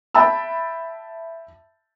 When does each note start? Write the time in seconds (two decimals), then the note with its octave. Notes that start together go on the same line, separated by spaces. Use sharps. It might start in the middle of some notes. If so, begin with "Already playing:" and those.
0.14 E5 G5 A5 B5 E6